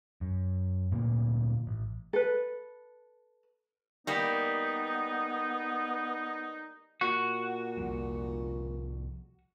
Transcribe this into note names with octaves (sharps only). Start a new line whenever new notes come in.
F#2
D2 A#2 A#3
A1
A4 B4
G3 A#3 B3 D#4
A#2 F#4
C2 F3 G3